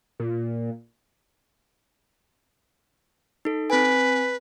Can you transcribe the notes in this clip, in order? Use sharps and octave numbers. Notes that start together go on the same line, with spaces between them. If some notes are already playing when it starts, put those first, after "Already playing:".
A#2
D#4 A4
C4 B4 G#5